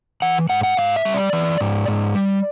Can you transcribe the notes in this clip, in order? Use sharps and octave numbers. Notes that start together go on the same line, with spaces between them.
E3 F#5
G#2 F#5
F#5
G#2 F5
E5
G3
D5
E3
G#2
G#2
G3